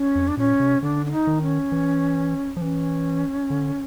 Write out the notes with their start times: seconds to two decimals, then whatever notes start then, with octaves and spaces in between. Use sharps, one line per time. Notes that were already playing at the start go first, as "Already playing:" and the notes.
Already playing: C#4
0.16 F2
0.28 D4
0.37 A#2 C#4
0.60 C3
0.83 D3 D4
1.06 D4
1.12 D#4
1.27 D#3
1.42 C#4
1.72 E3
2.57 F3
2.61 E3 C#4
3.50 D3